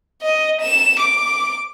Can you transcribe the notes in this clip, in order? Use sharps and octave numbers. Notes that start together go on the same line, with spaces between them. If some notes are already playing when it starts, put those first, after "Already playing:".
D#5
E7
D6